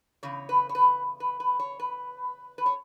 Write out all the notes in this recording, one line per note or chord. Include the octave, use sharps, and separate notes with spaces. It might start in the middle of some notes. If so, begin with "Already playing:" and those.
E2 C#3 C#5
B4
C#5
B4
B4
B4
C#5
B4
B4
C#5